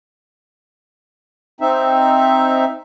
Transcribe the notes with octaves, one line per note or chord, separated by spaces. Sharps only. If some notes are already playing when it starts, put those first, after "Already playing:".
C4 D#4 E5